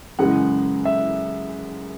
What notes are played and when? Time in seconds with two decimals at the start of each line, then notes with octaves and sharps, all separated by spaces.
0.19 F#2 C#3 E3 G#3 F#5
0.85 E5